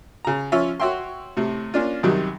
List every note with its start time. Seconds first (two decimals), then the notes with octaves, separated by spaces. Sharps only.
0.25 C#3 A#5
0.52 F3 C#4 F4 C#5 E5
0.80 F#4 C#5 E5 G5 C6
1.37 A2 C3
1.74 A#3 C#4 D4 F4
2.03 F#2 C3 D#3 F#3 G3